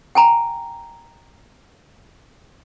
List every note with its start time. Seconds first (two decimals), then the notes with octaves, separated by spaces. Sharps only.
0.15 G5 G#5 A#5